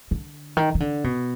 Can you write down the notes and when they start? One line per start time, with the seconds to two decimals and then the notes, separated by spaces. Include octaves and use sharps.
0.11 D3
0.57 D#3
0.75 D#3
0.80 D3
1.04 B2